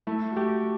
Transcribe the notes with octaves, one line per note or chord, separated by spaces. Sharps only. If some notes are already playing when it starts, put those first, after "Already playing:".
A3 E4
F#4
A3 G4